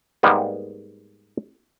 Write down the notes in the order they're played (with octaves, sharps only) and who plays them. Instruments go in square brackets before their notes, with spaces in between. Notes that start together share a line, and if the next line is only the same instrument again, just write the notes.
[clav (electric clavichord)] G#2 G3 A#3 B3